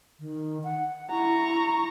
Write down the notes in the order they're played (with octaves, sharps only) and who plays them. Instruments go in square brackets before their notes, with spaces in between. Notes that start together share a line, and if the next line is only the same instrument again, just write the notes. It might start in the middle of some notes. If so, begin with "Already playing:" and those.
[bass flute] D#3
F#5
[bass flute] E4 [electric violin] A#5 C#6